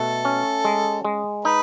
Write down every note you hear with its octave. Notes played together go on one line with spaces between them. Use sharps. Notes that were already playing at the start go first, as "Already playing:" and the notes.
Already playing: B2 A3 A4
C#4
G#3
G#3
D#4 B4